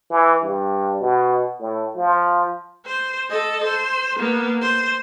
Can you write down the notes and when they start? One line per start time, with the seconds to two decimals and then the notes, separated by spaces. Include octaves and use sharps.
0.11 E3
0.43 G2
1.01 B2
1.60 A2
1.97 F3
2.86 C5
3.30 A4 D#5
3.65 C5
4.19 A#3 B3
4.61 C5